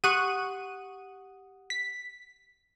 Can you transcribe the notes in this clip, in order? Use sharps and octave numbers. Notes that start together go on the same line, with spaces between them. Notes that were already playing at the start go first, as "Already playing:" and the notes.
G4 F#5 C#6 D#6 F#6 D#7
B6